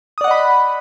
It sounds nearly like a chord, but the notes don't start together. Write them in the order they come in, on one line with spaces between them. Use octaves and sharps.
D#6 D5 F#5 D#5 B5